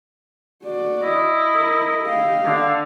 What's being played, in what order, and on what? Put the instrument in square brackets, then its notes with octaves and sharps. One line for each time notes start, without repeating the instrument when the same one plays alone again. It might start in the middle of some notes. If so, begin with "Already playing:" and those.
[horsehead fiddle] F#4 D5
[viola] E4 [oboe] D#5
[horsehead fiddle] A#4
G4 F5
[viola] D3